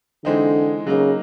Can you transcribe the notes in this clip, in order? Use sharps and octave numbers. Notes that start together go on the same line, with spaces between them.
D3 E3 G#3 C4 D#4
C#3 F#3 A#3 D#4